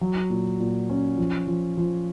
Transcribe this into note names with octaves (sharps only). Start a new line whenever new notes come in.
F#3
A#2
A#2
C#4
F3
F3
F3